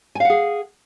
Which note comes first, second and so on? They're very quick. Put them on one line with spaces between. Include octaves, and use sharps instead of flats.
G#5 F5 F#5 G#4